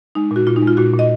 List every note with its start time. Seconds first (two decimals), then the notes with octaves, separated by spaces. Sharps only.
0.15 G#3 D#4
0.31 A#2
0.36 F#4
0.47 A#2 F4
0.56 D#4
0.62 G#3
0.67 F4
0.77 A#2 F#4
0.93 A#2
0.99 D#5